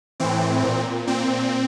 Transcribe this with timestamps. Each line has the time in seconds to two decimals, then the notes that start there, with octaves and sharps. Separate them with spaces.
0.20 A2 E3 C4
0.64 A#2
1.07 A#2 C4